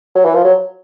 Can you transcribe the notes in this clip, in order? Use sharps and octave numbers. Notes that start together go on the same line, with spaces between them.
F#3
E3
F3
F#3